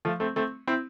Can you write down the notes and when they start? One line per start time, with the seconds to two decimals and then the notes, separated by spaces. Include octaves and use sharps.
0.05 F3 A3
0.20 A3 C4
0.36 A3 C4
0.67 C4 E4